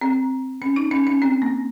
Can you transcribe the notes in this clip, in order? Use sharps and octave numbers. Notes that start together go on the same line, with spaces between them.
C4
C#4
D#4
C#4
C#4
C4
A#3